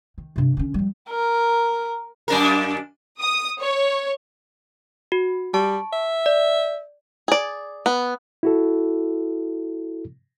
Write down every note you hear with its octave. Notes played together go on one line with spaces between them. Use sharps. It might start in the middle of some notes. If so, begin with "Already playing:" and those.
D#3
G2 C3
D3 C#4
F3 G3
A#4
F#2 D4 A#4
D#6
C#5
F#4
G3 A5 C#6
E5
D5
G#4 D5
B3
E4 F#4 A4